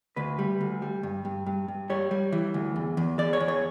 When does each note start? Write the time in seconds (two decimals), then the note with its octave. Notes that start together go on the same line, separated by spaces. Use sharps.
0.16 D2 B4
0.39 G3
0.61 D2
0.82 G3
1.03 G2
1.25 G2
1.46 G2
1.68 G2
1.90 G3 C#5
2.11 G3
2.32 E3
2.54 D2
2.76 E2
2.97 E2
3.19 E2 D5
3.33 C#5
3.40 E2
3.48 C#5